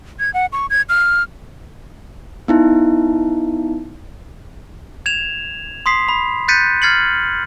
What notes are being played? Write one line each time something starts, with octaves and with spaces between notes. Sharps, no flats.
G#6
F#5
C#6
G#6
F6
B3 D#4 E4
G#6 E7 F7
C6 D#6 B6 C7
B5
F#6 G6 A6 B6 C#7 D#7
F6 G#6 A6 C7 C#7 F#7